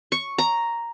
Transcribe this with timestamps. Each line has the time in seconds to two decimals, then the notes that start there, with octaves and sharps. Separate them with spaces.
0.12 C#6
0.38 A#5